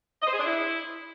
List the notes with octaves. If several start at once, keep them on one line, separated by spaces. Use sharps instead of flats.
D#5
C5
G#4
D4
E4